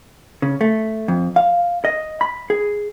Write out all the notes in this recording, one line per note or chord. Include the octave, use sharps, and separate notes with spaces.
C#3
A3
F2
F5
D#5
B5
G#4